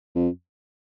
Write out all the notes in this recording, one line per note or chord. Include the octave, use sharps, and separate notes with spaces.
F2